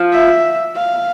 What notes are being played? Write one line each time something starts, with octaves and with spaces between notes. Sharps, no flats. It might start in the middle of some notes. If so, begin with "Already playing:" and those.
Already playing: F3
E5
F5